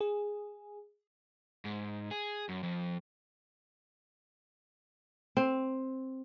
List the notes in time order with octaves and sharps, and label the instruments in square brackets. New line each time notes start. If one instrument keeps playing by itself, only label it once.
[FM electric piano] G#4
[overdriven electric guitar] G#2
G#4
F#2
F2
[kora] C4